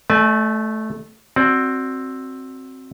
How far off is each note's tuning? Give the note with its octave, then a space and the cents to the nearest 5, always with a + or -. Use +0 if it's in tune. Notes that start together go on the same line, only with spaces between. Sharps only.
A3 -10 D5 +45 G#5 +45
C4 +10 F#4 +0 D5 +5